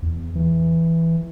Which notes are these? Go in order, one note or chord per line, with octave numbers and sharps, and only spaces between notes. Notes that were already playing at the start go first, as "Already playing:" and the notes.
E2
E3